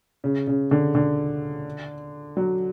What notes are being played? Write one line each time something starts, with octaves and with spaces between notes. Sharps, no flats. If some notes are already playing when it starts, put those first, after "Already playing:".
C#3
C#3
D3
D3
F#3